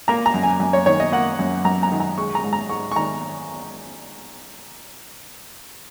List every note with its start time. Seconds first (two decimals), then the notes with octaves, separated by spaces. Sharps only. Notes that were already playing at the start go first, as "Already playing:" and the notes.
0.08 A#3 A#5
0.26 A#5
0.34 F#2
0.43 G#5
0.60 F#2
0.73 C#5
0.86 D#3 C#5
1.00 D#5
1.12 A#3 F#5
1.39 F#2
1.65 F#2 A#5
1.83 A#5
1.92 D#3
2.00 A#5
2.18 G#3 C#6
2.35 A#5
2.43 G#2
2.53 A#5
2.69 G#2 C#6
2.92 C#6
2.96 D#3 A#5